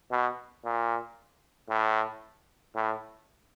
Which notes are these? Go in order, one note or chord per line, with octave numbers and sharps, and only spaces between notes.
B2
A#2
A2
A2